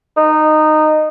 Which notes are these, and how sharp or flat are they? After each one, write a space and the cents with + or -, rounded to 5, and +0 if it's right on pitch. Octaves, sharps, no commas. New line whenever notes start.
D#4 -15